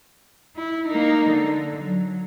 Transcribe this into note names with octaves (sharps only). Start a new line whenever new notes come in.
E4
A#3 D#4
D3
F#3